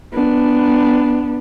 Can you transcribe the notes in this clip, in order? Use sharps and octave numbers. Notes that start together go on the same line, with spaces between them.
B3 D4